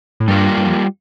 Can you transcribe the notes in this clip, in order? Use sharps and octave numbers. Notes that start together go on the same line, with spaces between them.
A2
G2 G3 A#3 F4
G2
F2